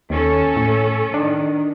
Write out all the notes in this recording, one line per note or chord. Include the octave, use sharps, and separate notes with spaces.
D#2 C#4 A4
A2
D#3 D4